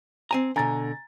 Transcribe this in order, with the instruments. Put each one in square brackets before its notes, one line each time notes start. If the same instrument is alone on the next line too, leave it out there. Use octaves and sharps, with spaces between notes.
[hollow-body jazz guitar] C4 G#5 A#5
[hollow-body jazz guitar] B2 D3 [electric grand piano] G#5 A#5 A6